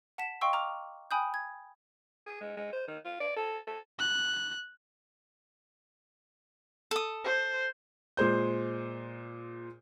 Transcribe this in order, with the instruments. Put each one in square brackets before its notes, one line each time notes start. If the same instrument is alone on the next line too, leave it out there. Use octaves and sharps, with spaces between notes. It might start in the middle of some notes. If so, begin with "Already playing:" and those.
[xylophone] F#5 A5 B6 E7
D#5 F5 G5 C6 C#6 E6
A#5 D6 F6 F7
G5 G#5 B5 D#6 F#6 G6
G#6
[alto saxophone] G#4
G#3
G#3
C5
D#3
F4
D5
A4
A4
[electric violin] F#6
[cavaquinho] A4 D#6
[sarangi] C5
[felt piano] A#2 G#3 C5 G6